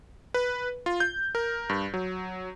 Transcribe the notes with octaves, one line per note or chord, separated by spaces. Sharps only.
B4
F4
G6
A#4
G2
F#3